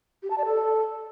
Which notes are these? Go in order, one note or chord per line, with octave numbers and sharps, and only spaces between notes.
G4
A5
D5
A4